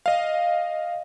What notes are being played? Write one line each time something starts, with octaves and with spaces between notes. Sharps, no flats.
D#5 F5